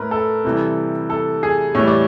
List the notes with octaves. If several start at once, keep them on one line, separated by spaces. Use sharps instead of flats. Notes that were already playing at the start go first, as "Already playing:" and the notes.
Already playing: A2 A#4 B4
A4
C3 E3 G3
A4
G#4
A2 E3 G3 C#5
D5